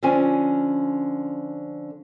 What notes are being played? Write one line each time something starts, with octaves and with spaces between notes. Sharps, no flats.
D3 F3 C#4 G#5